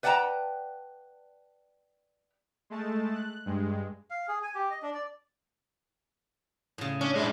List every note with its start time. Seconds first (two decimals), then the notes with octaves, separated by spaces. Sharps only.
0.03 B4 D5 F#5 G5 A5 A#5
2.70 G#3 A3 A5
3.14 F#6
3.46 G2 G#3
4.10 F5
4.28 G#4
4.43 G#5
4.55 G4
4.70 D#5
4.82 D4
4.94 D5
6.78 A2 C#3
7.01 C#4 D4
7.16 G#3 E4